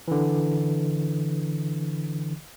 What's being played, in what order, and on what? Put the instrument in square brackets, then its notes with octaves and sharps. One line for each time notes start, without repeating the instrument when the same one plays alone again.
[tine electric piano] D3 E3